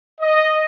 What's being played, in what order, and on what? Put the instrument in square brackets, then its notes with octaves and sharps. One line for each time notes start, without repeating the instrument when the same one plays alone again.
[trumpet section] D#5